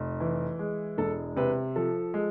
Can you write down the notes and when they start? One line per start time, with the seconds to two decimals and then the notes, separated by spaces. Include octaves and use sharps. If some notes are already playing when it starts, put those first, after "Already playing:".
Already playing: F1
0.20 E3
0.59 G#3
0.98 E1 A4
1.36 C3 B4
1.76 F3 A4
2.14 G#3